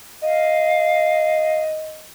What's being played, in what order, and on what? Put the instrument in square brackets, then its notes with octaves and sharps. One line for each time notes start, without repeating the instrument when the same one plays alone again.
[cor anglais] D#5 [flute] F5